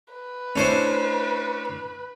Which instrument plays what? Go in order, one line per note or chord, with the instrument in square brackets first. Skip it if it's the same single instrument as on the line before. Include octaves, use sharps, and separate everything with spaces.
[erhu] B4
[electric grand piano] A3 D4 E4 [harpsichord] C#4 C5